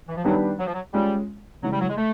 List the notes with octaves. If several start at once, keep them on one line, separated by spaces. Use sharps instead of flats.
E3
F3
D#3 F#3 G3 B3 D4 G4
F#3
F3
F#3
G3 G#3 C#4 F4
C#3 E3 F#3 G#3
G3
F#3
G#3
A3